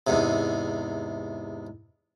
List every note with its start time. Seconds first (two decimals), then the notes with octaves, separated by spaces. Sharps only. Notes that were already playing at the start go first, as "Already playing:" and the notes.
0.07 E2 G#2 C3